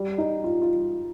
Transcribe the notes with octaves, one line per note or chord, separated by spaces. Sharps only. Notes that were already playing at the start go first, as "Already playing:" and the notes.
Already playing: G3
D#4
F4
F4